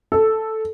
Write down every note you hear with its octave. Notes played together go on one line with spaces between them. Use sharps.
A4